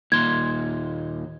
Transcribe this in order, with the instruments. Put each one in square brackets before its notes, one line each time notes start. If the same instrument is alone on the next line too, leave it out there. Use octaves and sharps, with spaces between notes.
[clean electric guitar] D#2 A#2 C6 [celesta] G#6